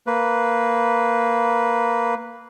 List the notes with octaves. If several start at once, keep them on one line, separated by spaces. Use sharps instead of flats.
A#3 B4